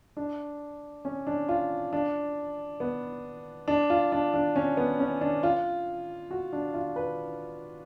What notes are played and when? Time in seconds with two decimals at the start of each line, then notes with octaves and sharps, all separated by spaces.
0.17 D4
1.05 C#4
1.27 D4
1.49 F4
1.93 D4
2.80 B3
3.68 D4
3.90 F4
4.12 D4
4.34 D4
4.56 C#4
4.77 B3
4.99 C#4
5.21 D4
5.43 F4
6.31 F#4
6.53 D4
6.74 F4
6.96 B4